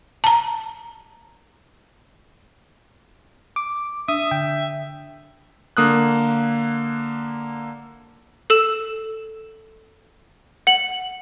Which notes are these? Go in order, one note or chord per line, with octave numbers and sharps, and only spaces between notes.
A5 A#5
D6
D4 E5 D#6
D3 G5
D3 A#3 D#6 F#6
A4 E6 E7
F#5 F#7